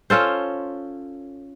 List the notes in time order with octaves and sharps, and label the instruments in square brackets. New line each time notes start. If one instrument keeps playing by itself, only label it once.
[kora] C#4 F4 A4 C5